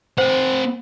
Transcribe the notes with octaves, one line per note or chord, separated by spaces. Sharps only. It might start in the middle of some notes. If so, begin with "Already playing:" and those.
C4 C5 F#5